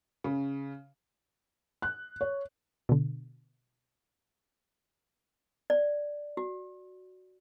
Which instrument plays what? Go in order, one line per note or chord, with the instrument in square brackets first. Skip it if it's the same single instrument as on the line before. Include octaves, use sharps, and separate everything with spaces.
[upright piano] C#3
[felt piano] F#6
C#5
[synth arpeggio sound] B2 D3
[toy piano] D5
F#4